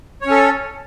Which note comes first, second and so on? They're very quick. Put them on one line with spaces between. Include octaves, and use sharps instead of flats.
C#5 C#4 A4